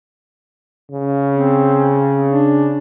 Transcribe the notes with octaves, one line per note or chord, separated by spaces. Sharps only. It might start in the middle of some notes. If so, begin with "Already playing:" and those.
C#3
C4
D4